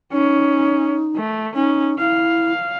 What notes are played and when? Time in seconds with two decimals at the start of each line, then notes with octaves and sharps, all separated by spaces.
0.13 C#4 D#4
1.16 A3
1.55 C#4 D#4
1.99 E4 F5